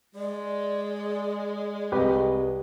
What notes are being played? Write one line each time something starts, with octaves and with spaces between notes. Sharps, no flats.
G#3 D5
C2 G4 B4 D#5